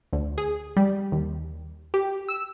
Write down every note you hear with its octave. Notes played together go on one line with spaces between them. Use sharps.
D2
G#4
G3
D#2
G4
E6